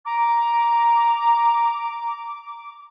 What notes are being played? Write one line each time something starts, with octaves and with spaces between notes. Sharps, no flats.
A#5 D6